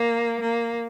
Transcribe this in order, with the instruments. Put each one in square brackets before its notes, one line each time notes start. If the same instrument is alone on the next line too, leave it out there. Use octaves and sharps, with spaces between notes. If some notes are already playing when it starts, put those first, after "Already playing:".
Already playing: [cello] A#3
A#3